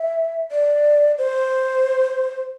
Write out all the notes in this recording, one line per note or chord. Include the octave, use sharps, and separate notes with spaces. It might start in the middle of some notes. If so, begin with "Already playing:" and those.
Already playing: E5
D5
C5